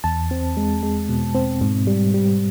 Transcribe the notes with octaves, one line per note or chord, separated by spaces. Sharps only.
E2 A5
C4
G#3
G#3
B2
C4
G#2
G3
G3